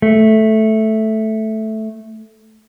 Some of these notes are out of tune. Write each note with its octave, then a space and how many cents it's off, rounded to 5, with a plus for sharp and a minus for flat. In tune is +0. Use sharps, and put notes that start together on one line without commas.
A3 -5